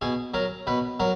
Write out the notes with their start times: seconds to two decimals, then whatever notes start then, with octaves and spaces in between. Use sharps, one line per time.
0.01 B2 G#4
0.34 F#3 A#4
0.67 B2 B4
1.00 F#3 A#4